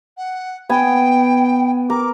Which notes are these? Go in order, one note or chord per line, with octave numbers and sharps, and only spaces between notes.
F#5
B3 G5 G#5
A#4 D6